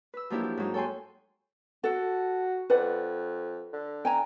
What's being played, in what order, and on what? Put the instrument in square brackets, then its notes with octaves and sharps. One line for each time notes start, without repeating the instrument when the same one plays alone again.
[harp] B4 E6
F3 F#3 A#3 D4 E4 G4
G4
G#2 F#3 D#4
A4 C#5 G5 G#5 C6
[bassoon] F#4 [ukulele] A4 F#5
[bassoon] F2 [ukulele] B4 D5 F#5
[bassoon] D3
[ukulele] G5 G#5 A#5